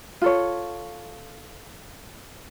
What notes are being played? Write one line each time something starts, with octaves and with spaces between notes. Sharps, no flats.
F4 A4 C#5